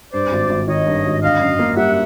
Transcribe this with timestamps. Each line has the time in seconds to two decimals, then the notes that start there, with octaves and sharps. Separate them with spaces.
0.13 G2 C5 D5
0.32 G#1
0.50 G#1
0.68 D#3 C#5 D#5
0.86 G2
1.05 G#1
1.22 D3 D#5 F5
1.40 F#2
1.59 A#3
1.77 G3 E5 F#5